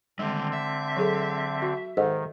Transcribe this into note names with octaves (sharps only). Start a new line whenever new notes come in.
D3 D#3 G3 G#3 C4
E5
F#3 G#4 A4
F#4
G#2 D#3 A4 D#5